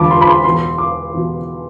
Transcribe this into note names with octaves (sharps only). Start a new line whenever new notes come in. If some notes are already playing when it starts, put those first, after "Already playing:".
Already playing: E1 E2 D3 F3 A5 B5 D6
C6
B5
C6
E2 B2 C6
D6
E2 B2